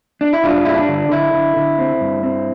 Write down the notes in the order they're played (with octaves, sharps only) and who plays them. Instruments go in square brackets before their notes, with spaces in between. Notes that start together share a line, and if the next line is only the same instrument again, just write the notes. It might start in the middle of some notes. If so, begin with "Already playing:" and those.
[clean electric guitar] D4
E4
G2 D4 F4
G2 E4
D4
D3
D3 E4
D3
D3
C4
G2
C4